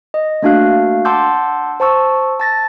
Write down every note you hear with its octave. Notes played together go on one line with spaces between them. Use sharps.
D#5
A3 A#3 D4 F#4 F5 F#6
F#5 A5 C6 D6 E6 G6
C5 A5 C#6 E6
A5 A6 A#6